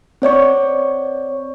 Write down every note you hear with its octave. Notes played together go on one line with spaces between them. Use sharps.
C4 C#5 D5 C#6